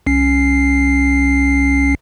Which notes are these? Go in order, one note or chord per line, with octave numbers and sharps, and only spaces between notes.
C2 C#4 C7